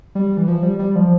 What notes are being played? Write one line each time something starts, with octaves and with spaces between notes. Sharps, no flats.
G3
E3
F3
G3
G3
F3